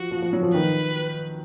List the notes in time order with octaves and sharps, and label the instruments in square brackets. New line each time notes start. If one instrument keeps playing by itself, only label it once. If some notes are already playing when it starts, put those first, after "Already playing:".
Already playing: [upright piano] F3 [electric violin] F#4
[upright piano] F3
F3
F#3
F3
[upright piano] D#3 [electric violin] B4